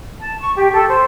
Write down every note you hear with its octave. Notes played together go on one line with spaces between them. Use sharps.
A5
C#6
G4
A4
C5